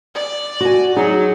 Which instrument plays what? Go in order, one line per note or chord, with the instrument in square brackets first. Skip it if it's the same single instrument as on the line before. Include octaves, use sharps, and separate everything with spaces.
[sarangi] D5
[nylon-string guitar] F#4 G#5
[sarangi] F#3 [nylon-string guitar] D#4 [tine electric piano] G#4